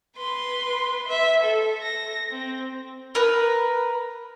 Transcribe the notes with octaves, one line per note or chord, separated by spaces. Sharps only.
B4 C6
E5
A4
A#6
C4
A#4 B4